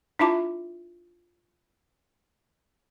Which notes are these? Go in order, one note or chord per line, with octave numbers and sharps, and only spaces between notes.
D4 E4 F4 E5 A5 D6